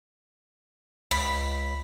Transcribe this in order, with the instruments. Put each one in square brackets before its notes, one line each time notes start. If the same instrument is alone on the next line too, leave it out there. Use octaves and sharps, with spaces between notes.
[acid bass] C#2 [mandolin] B5